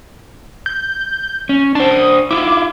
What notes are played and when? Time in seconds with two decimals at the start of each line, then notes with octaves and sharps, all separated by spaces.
0.66 G6
1.49 C#4
1.75 D4 C5 A5
1.91 D#6
2.31 E4 F4 D6